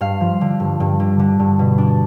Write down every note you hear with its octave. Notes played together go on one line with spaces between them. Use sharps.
G2 F5
F3
D3
G2
G2
D3
D3
G2
B2
D4